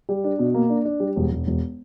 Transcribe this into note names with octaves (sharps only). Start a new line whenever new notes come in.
G3
D4
B2
A#3
D4
D4
G3
E1
E1
E1